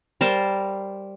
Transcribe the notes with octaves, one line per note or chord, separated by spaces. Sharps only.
G3 A#4 C5 A5